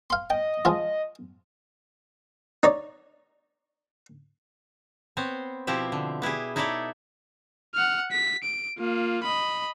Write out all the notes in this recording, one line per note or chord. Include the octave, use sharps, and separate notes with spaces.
F5 C6
D#5 G5
F3 G#3 F4
D#4 C#5 D5
B3 C4 C5 C#5
B2 F3 C4 E4 G4 E5
D3
B3 E4 G4 G#4
D#4 E4 A4 C#5 D5 E5
F#5 F6
B6
D7
A#3 F4
D#5 B5